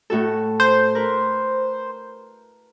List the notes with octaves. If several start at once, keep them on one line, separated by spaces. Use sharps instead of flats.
A2 F#4 A4
C5
A#4 B4